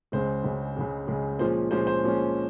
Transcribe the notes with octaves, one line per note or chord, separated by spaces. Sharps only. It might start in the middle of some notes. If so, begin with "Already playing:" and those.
C#2 C#3 G#3 C5
C#2 C#3 G#3
C#2 C#3 G#3
C#2 C#3 G#3
A#2 F3 G#3 C#4 C5
A#2 F3 G#3 C#4 C5
C5
A#2 F3 G#3 C#4